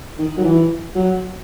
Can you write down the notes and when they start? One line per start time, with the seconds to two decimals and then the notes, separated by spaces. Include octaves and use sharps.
0.19 D#3
0.37 F#3
0.44 E3
0.95 F#3